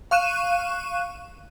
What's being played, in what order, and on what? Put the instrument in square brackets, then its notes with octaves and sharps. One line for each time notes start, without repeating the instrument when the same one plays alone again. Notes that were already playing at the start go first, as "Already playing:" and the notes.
[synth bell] F5 C#6 F#6 D#7 E7